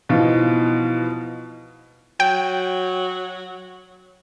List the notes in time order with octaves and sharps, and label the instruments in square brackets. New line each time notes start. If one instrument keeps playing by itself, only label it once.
[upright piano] B2 E3 F3 D#4 F4
[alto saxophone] F#3 [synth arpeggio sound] G5